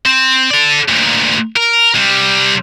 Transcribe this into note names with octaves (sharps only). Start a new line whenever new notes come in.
C4
A4 D5
D2 A#2
A#4
C3 G3